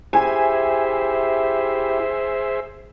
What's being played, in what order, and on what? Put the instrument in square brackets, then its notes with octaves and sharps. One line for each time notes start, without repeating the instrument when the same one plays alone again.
[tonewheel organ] E4 G4 [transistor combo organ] G#4 C5 E5 [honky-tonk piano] G#5